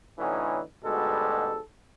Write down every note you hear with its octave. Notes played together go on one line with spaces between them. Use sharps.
A2 D3 E3 F#3 C#4 D#4
D2 G#2 B2 G3 G#3 A4